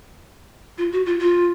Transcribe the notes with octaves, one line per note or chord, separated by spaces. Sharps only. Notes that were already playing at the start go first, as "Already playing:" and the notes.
F4
F#4
F4
F4